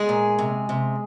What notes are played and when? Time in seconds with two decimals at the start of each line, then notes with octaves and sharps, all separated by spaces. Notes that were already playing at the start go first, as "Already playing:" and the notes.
Already playing: G#3 G#4
0.09 A#2
0.39 C3
0.69 C3